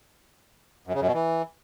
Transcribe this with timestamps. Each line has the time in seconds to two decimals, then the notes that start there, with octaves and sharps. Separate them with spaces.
0.87 F#2
0.94 C#3
1.01 F#2
1.07 B2
1.14 E3